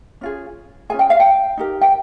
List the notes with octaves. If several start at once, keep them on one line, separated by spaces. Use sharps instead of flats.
C#4 F4 G#4
C#4 F4 G#4 G#5
G5
F5
G5
D#4 G4 A#4
G5